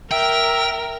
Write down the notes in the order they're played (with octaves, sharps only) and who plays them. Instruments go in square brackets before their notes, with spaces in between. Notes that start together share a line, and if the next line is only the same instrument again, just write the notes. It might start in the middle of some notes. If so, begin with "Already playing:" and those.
[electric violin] A#4 [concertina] E5 [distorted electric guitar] G5